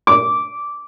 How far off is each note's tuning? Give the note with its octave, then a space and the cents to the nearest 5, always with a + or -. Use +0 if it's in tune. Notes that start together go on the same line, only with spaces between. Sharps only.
D6 -10